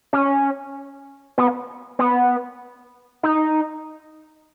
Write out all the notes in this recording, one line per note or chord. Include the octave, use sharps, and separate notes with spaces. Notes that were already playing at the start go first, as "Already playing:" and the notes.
C#4
B3
B3
D#4